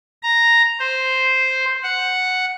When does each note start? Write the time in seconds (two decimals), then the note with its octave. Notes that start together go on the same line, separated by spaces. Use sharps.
0.23 A#5
0.80 C5
1.83 F#5